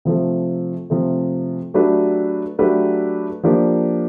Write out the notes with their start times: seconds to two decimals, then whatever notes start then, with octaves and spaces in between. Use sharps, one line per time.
0.05 C3 F3 A3
0.90 C3 F3 A3
1.74 F#3 A3 D4 G4 B4
2.59 F#3 A3 D4 G4 B4
3.43 F3 A#3 D4 G4